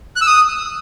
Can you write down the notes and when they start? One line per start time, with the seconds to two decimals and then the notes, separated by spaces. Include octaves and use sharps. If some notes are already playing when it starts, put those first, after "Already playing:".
0.16 F#6
0.21 E6
0.27 D#6